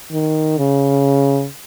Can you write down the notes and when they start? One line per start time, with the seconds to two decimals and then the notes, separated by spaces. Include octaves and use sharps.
0.12 D#3
0.58 C#3